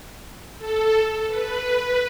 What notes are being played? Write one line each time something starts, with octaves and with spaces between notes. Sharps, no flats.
A4
B4